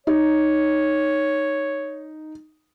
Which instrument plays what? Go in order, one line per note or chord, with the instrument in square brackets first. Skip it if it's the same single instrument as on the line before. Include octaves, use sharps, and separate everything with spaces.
[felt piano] D#4 [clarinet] C#5